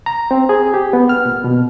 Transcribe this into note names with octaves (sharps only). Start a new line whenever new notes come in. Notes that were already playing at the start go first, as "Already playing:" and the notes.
A#5
C4
G#4
G4
B3
F6
A#2
B2